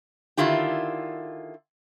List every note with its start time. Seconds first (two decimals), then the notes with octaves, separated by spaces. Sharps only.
0.37 D3 D#3 E4 F4 G4